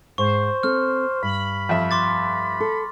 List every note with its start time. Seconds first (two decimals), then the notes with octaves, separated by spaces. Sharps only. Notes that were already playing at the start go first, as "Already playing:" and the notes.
0.18 G#2 C5 C#6
0.63 C4 A4 F6
1.23 G2 B5
1.69 F2 E5
1.91 C6 D6 A6
2.60 A4